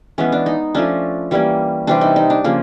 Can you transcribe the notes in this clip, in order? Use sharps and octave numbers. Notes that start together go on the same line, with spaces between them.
E3 G#3 B3 C#4
D4
D#4
F3 A3 C#4 D4
E3 G3 A#3 C#4
C3 E3 G3 C4 D4
D#4
D#4
D4
C#3 F3 A#3